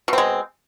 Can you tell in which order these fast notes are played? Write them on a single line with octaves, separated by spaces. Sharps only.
B2 C4 G#3